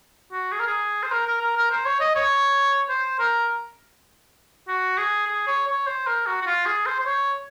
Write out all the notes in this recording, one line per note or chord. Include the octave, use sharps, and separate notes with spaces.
F#4
G#4
A#4
G#4
C5
A#4
A#4
A#4
A#4
C5
C#5
D#5
C#5
C5
A#4
F#4
G#4
G#4
C#5
C#5
C5
A#4
F#4
F#4
F4
G#4
C5
C5
C#5